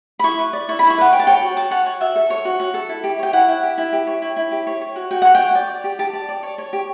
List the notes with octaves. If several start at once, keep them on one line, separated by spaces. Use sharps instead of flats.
B5
E4 C#6
B4
D5
E4 C#6
E4 B5
C#6
B4 F#5
C#5 G5
A5
C#5 G5
F#4
F#4 A5
C#5 F#5
C#5
F#4 E5
A4
C#5
F#4
F#4
A4
E4
G4
C#5 G5
E4 F#5
E4
G4
E4
G4
C#5
E4
E4
G4
C#5
C#5
F#4
F#4 G5
C#5 F#5
G5
C#5
D5
D5
G4
G4 A5
D5
D5
C#5
C#5
G4